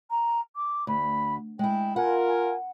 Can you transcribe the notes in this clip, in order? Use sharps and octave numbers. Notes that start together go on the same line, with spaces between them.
A#5
D6
D2 B5
G#3 E4 G5
F4 A#4 F#5 G#5
G#5